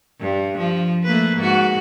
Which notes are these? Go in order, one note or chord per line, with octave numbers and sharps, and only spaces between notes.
G2
F3
A3 A#3 B4
G#2 F#4